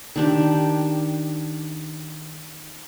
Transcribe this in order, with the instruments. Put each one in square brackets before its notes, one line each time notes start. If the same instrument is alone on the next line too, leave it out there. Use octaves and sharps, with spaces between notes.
[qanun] D#3 D4 G4